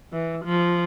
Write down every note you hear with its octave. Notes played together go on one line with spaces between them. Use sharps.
E3
F3